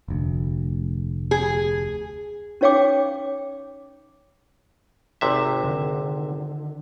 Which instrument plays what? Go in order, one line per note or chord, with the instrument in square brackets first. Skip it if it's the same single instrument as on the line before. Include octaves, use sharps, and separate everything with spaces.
[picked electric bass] F1 D2
[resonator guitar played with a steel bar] G#4
[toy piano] C#4 D#4 C#5 F5 G5 D6
[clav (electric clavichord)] G#1 C3 E5
[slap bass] D3 D#3